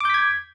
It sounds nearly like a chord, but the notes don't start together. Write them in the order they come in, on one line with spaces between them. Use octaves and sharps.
D6 G6 B6 G#6